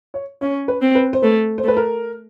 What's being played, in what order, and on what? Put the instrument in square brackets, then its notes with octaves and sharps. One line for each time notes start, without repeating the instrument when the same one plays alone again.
[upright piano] C#5
[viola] C#4 [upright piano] C#5
[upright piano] B4
[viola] C4
[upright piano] B4
C5
[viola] A3 [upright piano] B4
[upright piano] C5
[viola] A3 [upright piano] B4
[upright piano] A#4